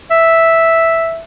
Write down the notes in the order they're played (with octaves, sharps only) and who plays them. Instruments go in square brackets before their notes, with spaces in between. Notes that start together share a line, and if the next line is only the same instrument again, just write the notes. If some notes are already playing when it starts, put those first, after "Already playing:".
[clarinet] E5